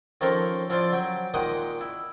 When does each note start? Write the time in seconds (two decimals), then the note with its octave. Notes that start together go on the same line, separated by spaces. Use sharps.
0.21 D#3 F3 C#4 A4 A#4 C5
0.70 F3 E4 F4 C5 D5 C6
0.92 F#3 G5
1.34 A#2 D#3 G#3 F#5 G5 D#6
1.81 E4